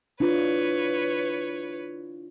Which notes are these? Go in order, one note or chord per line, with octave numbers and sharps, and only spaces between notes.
D4 E4 F4 B4 C#5